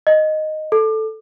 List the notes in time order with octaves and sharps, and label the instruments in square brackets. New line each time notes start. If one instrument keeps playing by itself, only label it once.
[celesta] D#5
A4